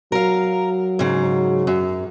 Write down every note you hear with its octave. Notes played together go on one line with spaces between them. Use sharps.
F#3 A#4 F5
G#2 C#3
F#2